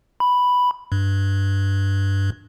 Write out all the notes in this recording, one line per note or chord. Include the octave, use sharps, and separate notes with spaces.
B5
G2